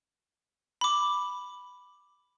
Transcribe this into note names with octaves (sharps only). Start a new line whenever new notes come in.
B5 D6